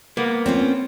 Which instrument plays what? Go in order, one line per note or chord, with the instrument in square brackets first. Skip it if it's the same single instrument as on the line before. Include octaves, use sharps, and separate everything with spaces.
[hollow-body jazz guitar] A#3 B3
[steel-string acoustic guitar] C4 C#4 F4